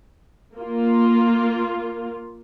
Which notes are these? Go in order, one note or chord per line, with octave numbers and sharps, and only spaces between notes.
A#3 F4